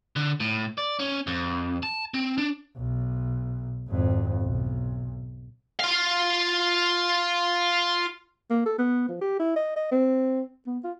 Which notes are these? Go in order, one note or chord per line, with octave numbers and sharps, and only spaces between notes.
D3
A2
D5
C#4
F2
A5
C4
D4
B1
G#1 F2
B1
F4 F5
A#3
A4
B3
F3
G4
E4
D#5
D#5
C4
B3
F4